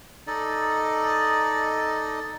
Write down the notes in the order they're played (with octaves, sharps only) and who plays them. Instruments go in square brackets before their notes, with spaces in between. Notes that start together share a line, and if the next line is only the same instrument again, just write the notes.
[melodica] D#4 A4 D5 D#5